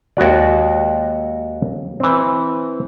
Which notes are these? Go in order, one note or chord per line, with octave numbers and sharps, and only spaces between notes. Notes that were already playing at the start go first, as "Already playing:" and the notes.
D#2 G#3 F#4 D5
E3 C4